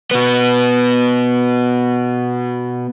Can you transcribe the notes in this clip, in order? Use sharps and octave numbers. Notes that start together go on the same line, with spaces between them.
B2 B3